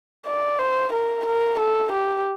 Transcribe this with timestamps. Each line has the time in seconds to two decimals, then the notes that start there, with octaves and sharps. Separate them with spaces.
0.26 D5
0.59 C5
0.93 A#4
1.26 A#4
1.59 A4
1.92 G4